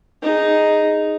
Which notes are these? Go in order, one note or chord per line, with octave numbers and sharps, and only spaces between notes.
D#4 G#4